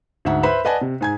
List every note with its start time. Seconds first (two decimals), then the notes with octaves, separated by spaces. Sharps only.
0.25 D2 G#2 E5 F#5
0.43 B4 C5 E5 B5
0.65 B4 D5 D#5 F#5 G#5 A5
0.81 C3
1.01 G#2 G#5 G#6